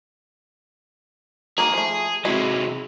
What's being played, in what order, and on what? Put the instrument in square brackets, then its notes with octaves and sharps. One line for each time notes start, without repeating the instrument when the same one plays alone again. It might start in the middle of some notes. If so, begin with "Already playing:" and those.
[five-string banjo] D#3 A#3 F#4 [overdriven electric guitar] G#4
[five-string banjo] F3 A3
[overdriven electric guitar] C3 F#3 [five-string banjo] G#3 E4